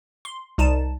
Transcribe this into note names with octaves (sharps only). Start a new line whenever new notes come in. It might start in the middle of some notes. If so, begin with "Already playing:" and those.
C6
C2 D#4 A5 E7